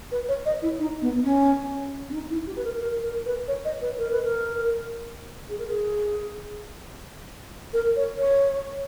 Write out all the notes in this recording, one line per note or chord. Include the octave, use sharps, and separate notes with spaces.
B4
C#5
D#5
E4
D#4
B3
C#4
C#4
D#4
E4
G4
B4
A#4
A#4
A#4
B4
C#5
D#5
B4
A#4
B4
A#4
G#4
A#4
G#4
A#4
C#5
C#5